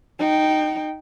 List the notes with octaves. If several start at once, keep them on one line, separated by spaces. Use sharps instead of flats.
D#4 G5